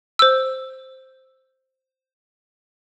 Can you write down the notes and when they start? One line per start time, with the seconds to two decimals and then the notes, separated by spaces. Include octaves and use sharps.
0.19 C5 E6